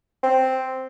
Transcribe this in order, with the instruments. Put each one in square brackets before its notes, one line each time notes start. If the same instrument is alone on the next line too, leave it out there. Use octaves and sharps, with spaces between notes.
[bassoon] C4